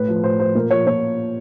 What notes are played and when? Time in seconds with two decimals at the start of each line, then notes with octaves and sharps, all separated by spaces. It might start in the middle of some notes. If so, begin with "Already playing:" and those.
Already playing: A2 B4
0.08 F3
0.23 A2 C5
0.39 F3 C5
0.55 A#2 A#4
0.71 F3 C#5
0.86 A#2 C#5